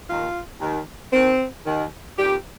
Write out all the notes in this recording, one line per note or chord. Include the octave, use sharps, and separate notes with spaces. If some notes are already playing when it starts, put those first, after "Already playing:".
D#2 D#3 F4
D#2 D#3
D#2 D#3 C4
D#2 D#3
F2 D#3 G4